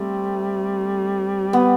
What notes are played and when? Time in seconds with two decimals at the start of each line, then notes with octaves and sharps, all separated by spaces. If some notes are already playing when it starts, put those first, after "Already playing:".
Already playing: G3 A3 C4
1.53 B3